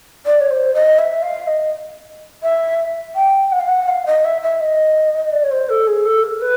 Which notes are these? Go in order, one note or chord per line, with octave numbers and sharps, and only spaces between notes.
D5
C#5
C5
D#5
E5
F5
D#5
E5
G5
F#5
F5
F#5
F5
D#5
E5
E5
D#5
D5
C#5
C5
A4
G#4
A4
A#4
B4